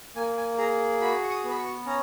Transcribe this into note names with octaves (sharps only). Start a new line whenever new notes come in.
A#3 G#5
G#5
G#4 A#5
F#4 B5
C#6
D#6
B3
B5
C#6
C#4 A#5